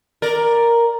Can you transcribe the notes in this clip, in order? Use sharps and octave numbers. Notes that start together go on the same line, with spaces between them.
A#4 D5